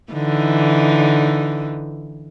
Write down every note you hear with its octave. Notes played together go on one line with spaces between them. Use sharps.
D3 E3 D#4